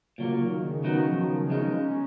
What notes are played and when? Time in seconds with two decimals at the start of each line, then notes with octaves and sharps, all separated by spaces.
0.18 A#2 C#3 F#3 A#3
0.40 D#3
0.62 C#3
0.84 B2 D#3 F#3 B3 D#4
1.06 F3
1.29 F#3
1.50 C#3 G#3 B3 D#4
1.73 C#4